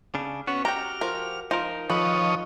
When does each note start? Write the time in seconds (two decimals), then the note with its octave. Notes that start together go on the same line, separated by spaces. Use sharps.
0.15 C#3 D4
0.47 B3 C#4 F#4
0.65 F#4 G4 G5 A#5 F6
1.01 F3 A#4
1.51 F3 D#4 A#4
1.90 D#3 F3 A4 B4 C#5 D#5 B5